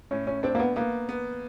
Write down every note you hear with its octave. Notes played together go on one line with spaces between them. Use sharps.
A2 C#4
C#4
C4 D4
A#3
B3
A#3 B3
B3